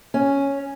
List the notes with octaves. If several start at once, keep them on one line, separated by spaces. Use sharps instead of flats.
C#4